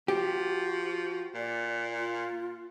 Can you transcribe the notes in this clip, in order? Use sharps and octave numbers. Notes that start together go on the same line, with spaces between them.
F3 F#4 G4
A#2 D5
F4